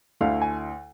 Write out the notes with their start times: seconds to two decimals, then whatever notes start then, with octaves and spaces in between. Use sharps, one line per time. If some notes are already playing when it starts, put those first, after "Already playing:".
0.21 D2 D3 A3 E4 F5
0.42 G#5